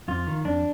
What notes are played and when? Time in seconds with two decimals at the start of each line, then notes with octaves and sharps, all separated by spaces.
0.08 F2 F4
0.27 D#3
0.45 F2 D4